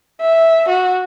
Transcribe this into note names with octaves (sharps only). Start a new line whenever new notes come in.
E5
F#4